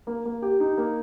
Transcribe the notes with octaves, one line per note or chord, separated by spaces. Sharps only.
A#3
A#3
G4
D#4
A#3